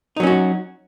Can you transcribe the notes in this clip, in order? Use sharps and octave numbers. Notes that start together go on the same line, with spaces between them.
F#3 C#4 D#4 F#4